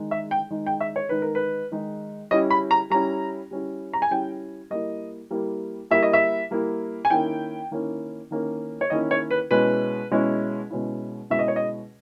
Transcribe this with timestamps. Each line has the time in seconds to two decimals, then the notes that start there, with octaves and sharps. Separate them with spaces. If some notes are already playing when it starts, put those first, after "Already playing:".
Already playing: D#3 G#3 D#4
0.11 E5
0.31 G5
0.50 D#3 G#3 D#4
0.66 G5
0.81 E5
0.96 C#5
1.09 D#3 G#3 D#4 B4
1.22 A#4
1.35 B4
1.72 D#3 G#3 D#4
2.31 G3 C#4 E4 D#5
2.50 B5
2.71 A#5
2.90 G3 C#4 E4 A#5
3.51 G3 C#4 E4
3.93 A#5
4.02 G#5
4.11 G3 C#4 E4 G5
4.70 G3 A#3 E4 D#5
5.31 G3 A#3 E4
5.91 G3 A#3 E4 E5
6.03 D#5
6.13 E5
6.51 G3 A#3 E4
7.05 G#5
7.10 D#3 A#3 C#4 E4 G5
7.71 D#3 A#3 C#4 E4
8.31 D#3 A#3 C#4 E4
8.81 C#5
8.90 D#3 A#3 C#4 E4 D#5
9.11 C#5
9.31 B4
9.51 B2 G#3 C#4 E4 B4
10.11 B2 G#3 C#4 E4
10.71 B2 G#3 C#4 E4
11.30 B2 G#3 C#4 E4 E5
11.39 D#5
11.48 C#5
11.56 D#5